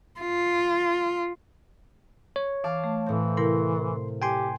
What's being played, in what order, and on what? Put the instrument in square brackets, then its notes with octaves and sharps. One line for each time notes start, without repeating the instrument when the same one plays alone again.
[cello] F4
[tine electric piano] C#5
[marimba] E3 [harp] F5 A5 D6
[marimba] A3
[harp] A2 C4 [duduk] E3
[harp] C3 [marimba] E4 A#4 [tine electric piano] C6
[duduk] G4 [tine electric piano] G5 G#5 C6